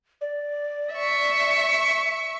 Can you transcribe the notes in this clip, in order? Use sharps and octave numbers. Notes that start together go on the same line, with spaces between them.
D5
E5 C#6